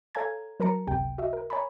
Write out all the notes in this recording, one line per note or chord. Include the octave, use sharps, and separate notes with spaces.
A4 C#5 F5 G#5 A#5 G#6
F#3 A#4 A5 A#5 C#7
G1 C#2 C3 G5
F#4 D#5 E5
A#4
C#5 G#5 A#5 B5